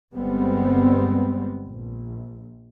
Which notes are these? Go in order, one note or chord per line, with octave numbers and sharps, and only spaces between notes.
G1 G3 G#3 B3 C4
A#1